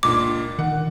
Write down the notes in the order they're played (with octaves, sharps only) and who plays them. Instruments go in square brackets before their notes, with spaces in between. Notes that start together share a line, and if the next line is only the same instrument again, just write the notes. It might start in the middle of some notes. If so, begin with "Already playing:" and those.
[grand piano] C#2 A#2 D4 [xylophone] D6
[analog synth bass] D#3 [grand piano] F#5